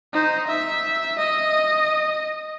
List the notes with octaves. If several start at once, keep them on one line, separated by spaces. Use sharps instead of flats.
D#4 C5
E5
D#5